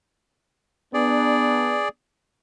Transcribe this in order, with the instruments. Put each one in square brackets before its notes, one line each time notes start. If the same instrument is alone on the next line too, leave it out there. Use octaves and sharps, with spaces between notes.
[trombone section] B3 D4 [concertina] G#4 D5